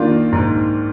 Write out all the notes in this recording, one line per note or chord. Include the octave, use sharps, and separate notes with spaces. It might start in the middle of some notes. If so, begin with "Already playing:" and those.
Already playing: D#3 A#3 D4 F4
G#2